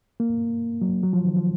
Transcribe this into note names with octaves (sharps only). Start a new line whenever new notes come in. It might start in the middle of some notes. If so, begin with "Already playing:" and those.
A#3
F#3
F#3
F3
D#3
F3